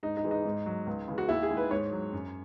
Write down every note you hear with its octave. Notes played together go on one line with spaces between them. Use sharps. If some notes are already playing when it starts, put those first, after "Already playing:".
G#2 D#4
D#4
E3 G#3
D#4
G#2
F#3
C#2
C#3 E3 G#3
F#4
D#2 E4
G#4
D#3 G#3
B4
G#2 C#5
F#3
F#2